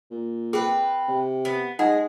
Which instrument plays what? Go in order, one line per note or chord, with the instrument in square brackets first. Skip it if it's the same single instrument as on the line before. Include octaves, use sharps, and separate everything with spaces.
[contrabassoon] A#2
[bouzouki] C4 B4 [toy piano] G#4
[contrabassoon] C3
[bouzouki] B3
[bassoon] G#3 [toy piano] D#4 F#5 [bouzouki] G#4